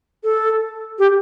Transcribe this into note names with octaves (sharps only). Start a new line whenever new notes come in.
A4
G4